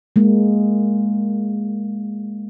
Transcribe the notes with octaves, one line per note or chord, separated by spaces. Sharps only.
G#3 A#3